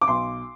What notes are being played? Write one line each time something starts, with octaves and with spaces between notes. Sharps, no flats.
D6
B1 C6